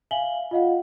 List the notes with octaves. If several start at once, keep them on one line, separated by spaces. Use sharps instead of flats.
E5 F5 G#5 F#7 G7
F4 D#5 F5 F#5